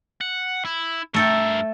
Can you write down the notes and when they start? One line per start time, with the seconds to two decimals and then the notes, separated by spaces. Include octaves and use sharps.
0.21 F#5
0.65 E4
1.14 G2 A3 A4 A#4 G5